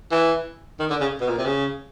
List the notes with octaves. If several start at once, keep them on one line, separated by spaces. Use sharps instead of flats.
E3
D#3
D3
C#3
B2
A#2
C3
C#3